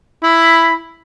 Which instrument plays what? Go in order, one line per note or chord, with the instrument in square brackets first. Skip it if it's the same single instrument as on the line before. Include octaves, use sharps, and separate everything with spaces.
[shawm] E4 [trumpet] B5